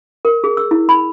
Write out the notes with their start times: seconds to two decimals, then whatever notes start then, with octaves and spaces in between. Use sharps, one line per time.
0.25 A#4
0.44 G#4
0.57 E6
0.71 E4
0.89 B5